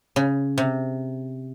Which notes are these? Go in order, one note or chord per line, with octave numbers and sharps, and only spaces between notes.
C#3
C3